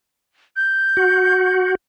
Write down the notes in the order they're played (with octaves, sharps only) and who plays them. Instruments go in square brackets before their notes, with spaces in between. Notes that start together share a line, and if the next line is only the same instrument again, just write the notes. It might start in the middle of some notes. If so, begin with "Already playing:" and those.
[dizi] G6
[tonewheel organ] F#4